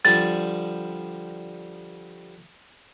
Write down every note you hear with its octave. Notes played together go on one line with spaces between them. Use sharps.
D3 F3 G3 A6